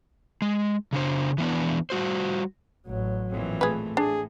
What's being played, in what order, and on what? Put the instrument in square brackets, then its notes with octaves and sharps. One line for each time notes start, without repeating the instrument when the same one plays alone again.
[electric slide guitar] G#3
C#3 D4 C5
E3 B3 D4
G3 F#4 C5
[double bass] A1 F#3
[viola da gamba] F2 A#2 E3
[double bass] A3 [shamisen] G#4 B4
[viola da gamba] A2 [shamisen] D4 [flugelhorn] G#4